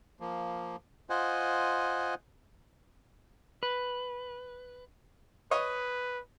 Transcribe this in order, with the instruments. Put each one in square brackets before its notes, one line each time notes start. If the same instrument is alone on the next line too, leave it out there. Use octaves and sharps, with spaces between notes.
[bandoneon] F3 A#3
F4 C5 D#5 F#5 G#5
[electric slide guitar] B4
[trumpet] B4 [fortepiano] C#5 D#5